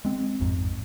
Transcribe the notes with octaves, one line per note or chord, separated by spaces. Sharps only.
G#3 C4
A1 F2 G#2